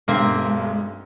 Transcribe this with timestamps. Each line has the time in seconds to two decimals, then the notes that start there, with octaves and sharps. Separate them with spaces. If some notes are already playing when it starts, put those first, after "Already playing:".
0.08 B1 G2 G#3 A#3 C4 E5